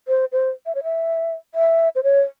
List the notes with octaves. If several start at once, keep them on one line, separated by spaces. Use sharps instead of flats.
C5
C5
E5
C#5
E5
E5
C5
C#5